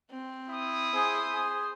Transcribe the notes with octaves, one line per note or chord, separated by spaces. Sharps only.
C4
E4 D#6
G#4 C5
G#4